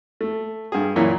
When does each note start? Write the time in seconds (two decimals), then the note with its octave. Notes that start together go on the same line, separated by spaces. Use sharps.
0.21 A3
0.72 G2 G#4
0.96 F#2 A#2 E3 C#5